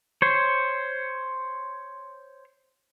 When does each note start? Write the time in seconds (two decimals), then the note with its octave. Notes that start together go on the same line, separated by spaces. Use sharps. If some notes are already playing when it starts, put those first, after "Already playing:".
0.22 C5 C#5